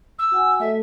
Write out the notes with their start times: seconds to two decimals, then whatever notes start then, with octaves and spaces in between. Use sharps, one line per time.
0.18 E6
0.32 F#4 F#5 G#5
0.60 A3 A4 D#5 E5